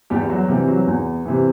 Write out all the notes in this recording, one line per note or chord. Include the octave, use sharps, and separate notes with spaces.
E2 G3 G4
F#3 F#4
C3 E3 G3 G4
F#3 F#4
E2
C3 E3